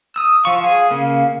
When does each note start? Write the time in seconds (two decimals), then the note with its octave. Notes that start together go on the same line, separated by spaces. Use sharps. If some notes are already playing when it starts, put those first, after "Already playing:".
0.16 D#6 E6
0.45 F3 F5 C#6
0.64 G#4 F5
0.91 C#3 A#3